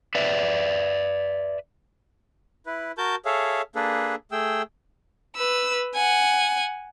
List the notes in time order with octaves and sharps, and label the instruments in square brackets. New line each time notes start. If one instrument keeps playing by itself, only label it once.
[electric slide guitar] B4 D5 E5
[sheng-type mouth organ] E4 B4
F#4 A#4 A5 G6
G#4 A4 C#5 E5 F5
A#3 D4 G#4 A4 B4
A3 G#4 G5 E6
[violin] B4 E6
F#5 G#5